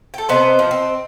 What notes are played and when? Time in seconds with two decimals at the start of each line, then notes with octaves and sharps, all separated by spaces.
0.14 A4 G5
0.29 C3 B3 C5 D#5 C6
0.59 F3
0.71 C4